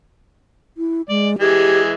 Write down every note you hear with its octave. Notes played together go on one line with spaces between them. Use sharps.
E4
G#3 D5
E3 G#3 G4